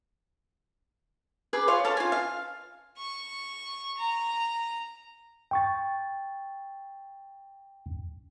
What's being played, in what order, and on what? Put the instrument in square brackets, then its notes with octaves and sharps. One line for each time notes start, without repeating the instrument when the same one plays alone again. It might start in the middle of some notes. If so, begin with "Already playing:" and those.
[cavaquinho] G#4 B4 D6
F4 C#5 F5 C6
A4 C#5 F5 A5
F4 G#5
F5
[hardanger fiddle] C#6
A#5
[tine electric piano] G5 C#6 A6